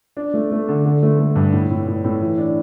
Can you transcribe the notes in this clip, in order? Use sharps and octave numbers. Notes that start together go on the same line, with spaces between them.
D4
A3
A3
D3
D3
A3
A3
G2
A2
A2
A2
A2
E3
D4